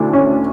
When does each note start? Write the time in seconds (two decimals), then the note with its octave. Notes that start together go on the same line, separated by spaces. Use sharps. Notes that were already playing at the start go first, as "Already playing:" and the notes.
Already playing: D2 D4 E4
0.13 C#4